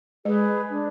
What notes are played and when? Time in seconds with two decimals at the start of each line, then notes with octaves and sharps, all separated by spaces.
0.25 G#3 G#4 B4
0.71 D4